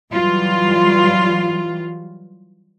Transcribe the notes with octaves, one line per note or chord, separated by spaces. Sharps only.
E3 F#3 G3 F4